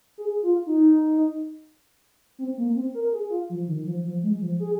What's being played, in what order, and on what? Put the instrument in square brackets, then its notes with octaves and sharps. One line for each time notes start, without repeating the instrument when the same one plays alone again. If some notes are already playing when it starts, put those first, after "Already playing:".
[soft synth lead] G#4
F4
D#4
C4
A#3
C4
A#4
G#4
F4
F3
D#3
F3
F3
G#3
F3
G#4